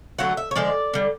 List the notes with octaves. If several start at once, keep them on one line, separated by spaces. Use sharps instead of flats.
D3 F#3 A3 F#5
E5
C#5
D3 F3 G#3 D5
D3 G3